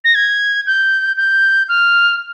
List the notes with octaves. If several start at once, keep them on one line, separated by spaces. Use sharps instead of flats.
A#6
G#6
G6
G6
F6